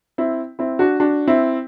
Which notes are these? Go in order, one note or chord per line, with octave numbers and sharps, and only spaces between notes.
C4 E4
C4 E4
D4 F#4
D4 F#4
C4 E4